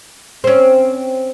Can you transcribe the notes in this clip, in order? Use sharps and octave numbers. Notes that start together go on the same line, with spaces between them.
C4 C#4